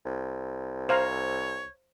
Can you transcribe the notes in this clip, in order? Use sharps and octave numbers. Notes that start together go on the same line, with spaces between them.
C2
C5 C#5 F5 A#5